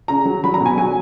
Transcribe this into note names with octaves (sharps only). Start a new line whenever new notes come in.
C#3 A#5
F#3
F#3 B5
A#5
B2
G#5
F#3 G#5